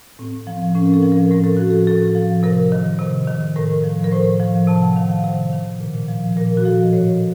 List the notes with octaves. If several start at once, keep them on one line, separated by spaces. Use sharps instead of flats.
A2 C4
F3
C4
A2 C#4
A#4
A4
F3
A#4
A2 A#4
A4
F3 F#4
A4
A2 A4
F3
C3 A#4
D#3
C3
D#3
A2 A#4
F3
A#4
A2 C5
F3
C3 A5
F#5
D#3 F5
F#5
C3
D#3
A#2
F3
A#2 A#4
F#4
F3 A4
D#5
A2 C#5